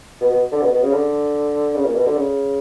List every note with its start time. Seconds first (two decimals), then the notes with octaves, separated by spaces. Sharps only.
0.21 B2
0.31 B2
0.52 D3
0.62 B2
0.72 B2
0.83 C#3
0.93 D3
1.75 C#3
1.86 A#2
1.96 B2
2.06 D3
2.16 C#3